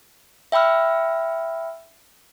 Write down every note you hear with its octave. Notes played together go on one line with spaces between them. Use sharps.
E5 G5 B5 E6 F6